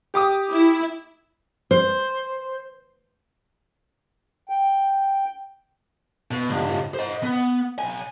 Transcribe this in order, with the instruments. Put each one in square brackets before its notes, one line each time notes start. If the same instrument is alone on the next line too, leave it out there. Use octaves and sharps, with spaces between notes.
[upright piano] G4 D6 D#6
[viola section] E4
[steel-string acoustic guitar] C5
[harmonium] G5
[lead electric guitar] B2
C#2 G2
C5 D#5
B3
B1 G#5